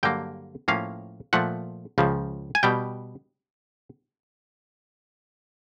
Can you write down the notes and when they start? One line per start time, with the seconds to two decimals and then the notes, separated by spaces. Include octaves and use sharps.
0.03 G2 D3 F#3 A#3 G5
0.68 A2 F3 A#3 C#4 F5
1.33 A#2 F3 A3 F#5
1.98 C#2 C#3 F3
2.55 G#5
2.63 B2 G3 G5